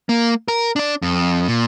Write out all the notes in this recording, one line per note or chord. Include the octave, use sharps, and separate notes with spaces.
A#3
A#4
D4 D5
F2
A#2